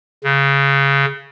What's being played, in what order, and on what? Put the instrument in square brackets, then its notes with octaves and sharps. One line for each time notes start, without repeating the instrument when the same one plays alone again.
[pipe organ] C#3